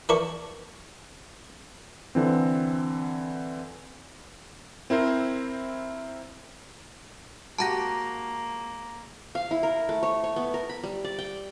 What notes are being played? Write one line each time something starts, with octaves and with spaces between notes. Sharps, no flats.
E3 A#4 D5 A5 C#6
D3 E3 C4
C4 E4 A#4 C5
G#3 A#3 F#4 G4 A5 A#5 A#6
F5
E4
A#4
A3
C#5
C#5
B3
A#4
B5
G3
D5
G5